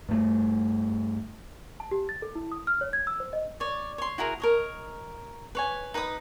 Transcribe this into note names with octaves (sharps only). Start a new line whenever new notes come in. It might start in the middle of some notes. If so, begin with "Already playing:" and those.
G2 A3
A5
G4
A6
A4
E4
D#6
F6
C#5
G#6
E6
C5
D#5
C#5 D5
C#5 C6
E4 F#4 G#4 A#4
A#4 C#5 D#5
B4 C#5 G#5
D#4 B4 B5 D#6